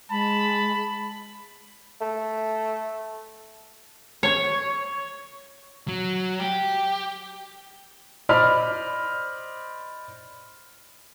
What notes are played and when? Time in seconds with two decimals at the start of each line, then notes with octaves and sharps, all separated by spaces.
0.10 G#3 A5 B5
2.01 A3
4.23 C#5
5.88 F#3
6.39 G4
8.29 C5 D5 D#5 B5 F6